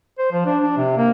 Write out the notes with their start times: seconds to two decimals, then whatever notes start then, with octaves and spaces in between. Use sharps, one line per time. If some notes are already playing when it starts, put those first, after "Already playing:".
0.19 C5
0.32 F3
0.46 D4
0.63 D4
0.77 C3
0.97 A#3